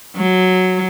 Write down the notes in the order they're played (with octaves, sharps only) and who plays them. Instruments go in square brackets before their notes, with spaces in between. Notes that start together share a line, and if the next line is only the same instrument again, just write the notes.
[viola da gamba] F#3